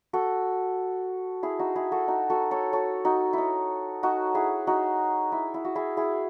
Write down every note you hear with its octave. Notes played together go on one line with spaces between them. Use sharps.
F#4 A4
E4 G#4
D#4 F#4
E4 G#4
F#4 A4
D#4 F#4
F#4 A4
A4 C#5
A4 C#5
D#4 F#4
D#4 E4
D#4 F#4
E4 G#4
D#4 F#4
E4
E4
F#4
E4 G#4
E4 G#4